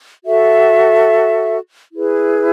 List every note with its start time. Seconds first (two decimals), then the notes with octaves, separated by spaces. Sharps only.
0.24 F#4 A4 E5
1.92 E4 G#4 B4